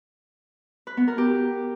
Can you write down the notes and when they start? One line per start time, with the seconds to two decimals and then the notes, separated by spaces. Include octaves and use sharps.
0.87 B4
0.97 B3
1.08 A#4
1.18 G4